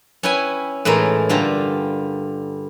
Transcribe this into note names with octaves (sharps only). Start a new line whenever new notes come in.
C#4 E4 B4 G5 G#5
A2 E3 G#3 D#4 A#4
G2 D3 F4 G4 A#5